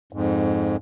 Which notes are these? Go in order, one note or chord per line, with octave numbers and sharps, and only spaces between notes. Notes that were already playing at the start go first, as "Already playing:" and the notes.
F2 G#2